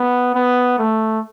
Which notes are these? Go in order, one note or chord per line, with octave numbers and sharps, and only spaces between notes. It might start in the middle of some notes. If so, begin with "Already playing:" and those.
Already playing: B3
B3
A3